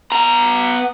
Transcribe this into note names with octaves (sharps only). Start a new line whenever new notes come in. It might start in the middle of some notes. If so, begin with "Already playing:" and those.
B3 A#5